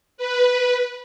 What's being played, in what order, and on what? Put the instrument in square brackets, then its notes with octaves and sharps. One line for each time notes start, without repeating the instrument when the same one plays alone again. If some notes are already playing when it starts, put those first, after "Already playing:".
[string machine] B4